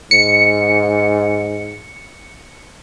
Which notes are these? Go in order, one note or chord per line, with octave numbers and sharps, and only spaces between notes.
G#2 C#7